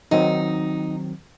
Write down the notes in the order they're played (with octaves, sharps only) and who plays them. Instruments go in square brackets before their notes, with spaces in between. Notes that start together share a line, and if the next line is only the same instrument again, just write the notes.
[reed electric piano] D#3 F#3 C4 [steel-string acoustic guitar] D#4